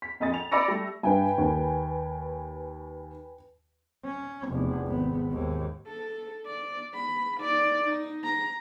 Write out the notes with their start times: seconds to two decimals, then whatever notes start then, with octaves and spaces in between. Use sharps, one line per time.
0.02 B6
0.20 A#1 F2 D#5 D#6 A6
0.34 F7
0.51 D5 B5 D6 E6 A#6 C#7
0.68 G3 A3
1.03 G2 B4 G5 G#5
1.38 D#2
4.04 C#4
4.49 F1 E2
4.87 G#1 B3
5.31 D#2 G#2
5.87 A4
6.46 D5
6.94 B5
7.40 D#4 D5
7.84 D#4
8.24 A#5